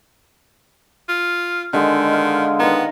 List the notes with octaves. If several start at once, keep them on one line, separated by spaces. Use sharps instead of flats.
F4
D3 D#3 G#3
F5
D#3 B3 A#4